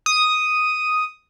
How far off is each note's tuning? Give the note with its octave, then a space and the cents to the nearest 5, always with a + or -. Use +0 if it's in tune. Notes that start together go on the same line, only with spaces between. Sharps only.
D#6 +0